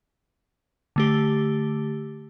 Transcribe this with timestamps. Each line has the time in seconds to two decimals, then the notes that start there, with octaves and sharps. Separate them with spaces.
0.96 D3 A3 G4